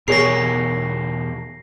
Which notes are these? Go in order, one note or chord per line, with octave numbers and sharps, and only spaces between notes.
E2 B2 G4 G#4 A#4 C#5 A#6 C7